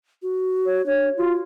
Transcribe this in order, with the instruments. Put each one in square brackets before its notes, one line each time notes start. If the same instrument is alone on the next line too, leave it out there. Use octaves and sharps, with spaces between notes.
[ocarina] F#4
[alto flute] C#5
[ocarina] D4 [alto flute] C#5
[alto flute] F4 [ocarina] F#4